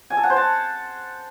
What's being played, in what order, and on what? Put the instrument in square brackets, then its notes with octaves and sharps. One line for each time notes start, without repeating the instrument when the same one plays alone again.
[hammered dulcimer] G#5
A4
F#5
C5
A5